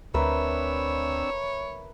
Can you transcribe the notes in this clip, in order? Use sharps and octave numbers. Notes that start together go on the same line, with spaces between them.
D2 C4 D4 A#4 B4 C#5 E5 E6